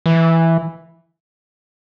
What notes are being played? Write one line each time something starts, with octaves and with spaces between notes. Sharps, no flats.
E3